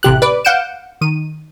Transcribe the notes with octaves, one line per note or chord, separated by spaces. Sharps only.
A1 C3 G4 F#6
B4 D5 D6
F5 F#5 G6 C#7 D7 E7
D#3 D#7